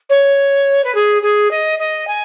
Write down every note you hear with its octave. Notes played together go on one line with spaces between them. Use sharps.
C#5
B4
G#4
G#4
D#5
D#5
G#5